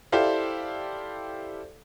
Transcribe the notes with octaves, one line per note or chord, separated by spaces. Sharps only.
E4 G4 A4 C5 D5 F5